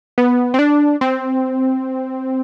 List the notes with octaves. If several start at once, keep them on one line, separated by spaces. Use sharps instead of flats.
B3
C4
D4
C4